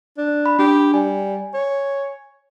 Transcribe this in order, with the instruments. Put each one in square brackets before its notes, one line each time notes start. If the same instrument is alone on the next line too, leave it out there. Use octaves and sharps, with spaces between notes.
[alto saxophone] D4
[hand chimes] B5
[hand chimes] D4 [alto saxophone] G4
[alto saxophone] G3 [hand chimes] G#5
[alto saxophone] C#5